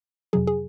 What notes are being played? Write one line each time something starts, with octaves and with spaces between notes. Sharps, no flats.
F2 C3 F#3 G#4
G#4